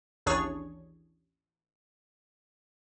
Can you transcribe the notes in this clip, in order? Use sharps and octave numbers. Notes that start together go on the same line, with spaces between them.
A1 D#2 D4 G#4 C#5 C#6